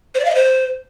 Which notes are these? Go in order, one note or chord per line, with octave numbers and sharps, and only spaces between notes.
C5
D5
F5
D#5
C5